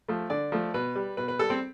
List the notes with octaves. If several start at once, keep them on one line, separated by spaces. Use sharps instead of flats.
F3 A3
D3 D5
F3 A3
B2 B4
G3
B2 B4
B4
G3 A4
C4